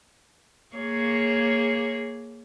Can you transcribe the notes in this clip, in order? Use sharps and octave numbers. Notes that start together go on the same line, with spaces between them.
A#3 G#4 C#5